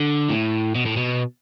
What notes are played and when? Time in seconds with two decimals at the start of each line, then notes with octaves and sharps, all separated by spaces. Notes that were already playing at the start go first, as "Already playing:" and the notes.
Already playing: D3
0.30 A2
0.75 B2
0.86 A2
0.97 B2